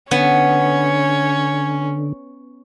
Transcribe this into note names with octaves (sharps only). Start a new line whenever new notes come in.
D3 B3 C#4 C#5